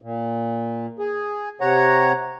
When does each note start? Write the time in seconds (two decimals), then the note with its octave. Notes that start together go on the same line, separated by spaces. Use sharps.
0.02 A#2
0.99 G#4
1.61 C3 C#5 F#5 A#5